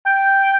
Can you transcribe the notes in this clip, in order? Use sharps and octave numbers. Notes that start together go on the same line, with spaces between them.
G5